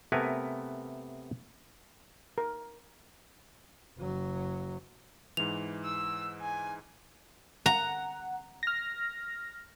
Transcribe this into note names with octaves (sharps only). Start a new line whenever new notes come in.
C3 A3 B3 A#4 B4 G#5
A#4
F#1 F#3
G#2 E3 F7
E6
G#5
F#5 A#5
F6 A#6